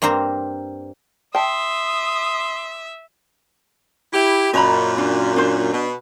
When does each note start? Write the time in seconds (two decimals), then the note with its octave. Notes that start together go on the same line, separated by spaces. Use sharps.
0.02 G2 A#3 C4 C5 A#5
1.35 E5 G5 A5 C6 D#6
4.13 E4 G4
4.54 F#2 A#2 D#5 A#5 B5
4.98 D4
5.36 D4 C5
5.73 B2